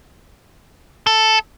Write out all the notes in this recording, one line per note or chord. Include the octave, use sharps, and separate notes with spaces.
A4